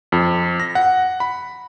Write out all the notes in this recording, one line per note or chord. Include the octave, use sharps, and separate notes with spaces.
F2
A#6
F#5
B5